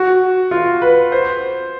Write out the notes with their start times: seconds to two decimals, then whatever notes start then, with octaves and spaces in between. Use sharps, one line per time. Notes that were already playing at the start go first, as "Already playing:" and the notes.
Already playing: F#4
0.51 F4
0.82 B4
1.12 C5